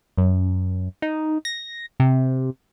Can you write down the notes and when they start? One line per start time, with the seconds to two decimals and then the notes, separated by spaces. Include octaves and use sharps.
0.17 F#2
1.02 D#4
1.45 A#6
2.00 C3